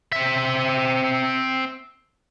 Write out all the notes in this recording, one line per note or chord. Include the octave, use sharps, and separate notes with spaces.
C4 E5